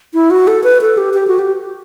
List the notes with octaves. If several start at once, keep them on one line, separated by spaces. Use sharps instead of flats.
E4
F#4
A4
B4
A4
G4
G4
F#4
G4